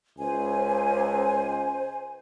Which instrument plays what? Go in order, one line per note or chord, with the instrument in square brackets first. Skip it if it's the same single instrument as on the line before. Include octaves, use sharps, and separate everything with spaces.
[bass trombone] C#2 [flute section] C5 G#5